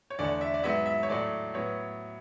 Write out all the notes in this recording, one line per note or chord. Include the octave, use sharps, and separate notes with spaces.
C#5
E2 D3 A3 D5
E5
D5
G#2 F#3 B3 E5
E5
C#5
A2 F#3 A3 D5
A2 F#3 B3 C#5